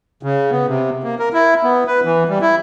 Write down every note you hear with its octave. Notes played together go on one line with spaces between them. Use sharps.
C#3
B3
C3
A#3
A#4
E4
B3
B4
E3
G3
E4